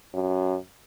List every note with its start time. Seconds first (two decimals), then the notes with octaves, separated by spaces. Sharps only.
0.14 F#2